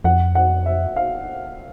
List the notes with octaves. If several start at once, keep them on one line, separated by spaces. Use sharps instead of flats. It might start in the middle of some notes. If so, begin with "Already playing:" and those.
F2 F#5
F#5
E5
F5